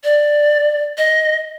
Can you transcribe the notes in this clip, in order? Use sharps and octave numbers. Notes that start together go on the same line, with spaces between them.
D5
D#5